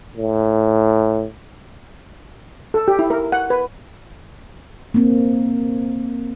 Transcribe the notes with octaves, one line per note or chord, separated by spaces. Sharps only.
A2
A4
G4
E4
A#4
F#5
B4
A#3 C4